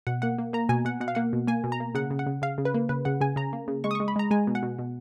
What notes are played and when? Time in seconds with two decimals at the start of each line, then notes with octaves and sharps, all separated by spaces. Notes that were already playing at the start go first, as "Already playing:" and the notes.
0.07 B2 F#5
0.22 A#3 F#5
0.38 A#3
0.53 A#3 A#5
0.69 B2 G#5
0.85 B2 F#5
1.00 B2 F#5
1.08 F5
1.15 A#3 F#5
1.33 B2
1.48 A#3 G#5
1.64 B2
1.72 A#5
1.80 A#3
1.95 C#3 F#5
2.10 C#3
2.19 F#5
2.27 C#3
2.42 C#3 F5
2.58 C#3
2.65 B4
2.74 A#3
2.89 C#3 B4
3.05 C#3 F#5
3.21 C#3 G#5
3.36 C#3 A#5
3.53 A#3
3.68 C#3
3.84 G#3 C#6
3.91 D#6
3.95 G#3 C#6
4.08 B5
4.16 G#3 A#5
4.31 G#3 G#5
4.47 B2
4.55 F#5
4.63 B2
4.79 B2